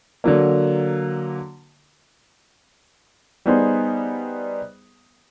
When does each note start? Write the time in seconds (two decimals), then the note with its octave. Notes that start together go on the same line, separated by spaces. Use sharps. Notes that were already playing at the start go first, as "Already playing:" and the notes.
0.24 D3 F#3 A#3
3.46 G3 B3 D#4 G#4 C5